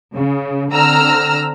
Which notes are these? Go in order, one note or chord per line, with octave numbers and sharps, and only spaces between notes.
C#3
D3 C4 A#5 E6 F6